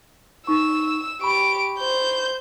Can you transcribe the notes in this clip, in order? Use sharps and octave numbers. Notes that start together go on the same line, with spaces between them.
D#4 C#6 E6
G4 B5 C#6 D7
C5 G6